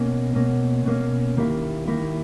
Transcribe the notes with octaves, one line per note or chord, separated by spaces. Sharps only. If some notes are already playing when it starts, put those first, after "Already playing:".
Already playing: B2 A#3 C#4
B2 A#3 C#4
B2 A#3 C#4
D#2 D#3 A#3 E4
D#2 D#3 A#3 E4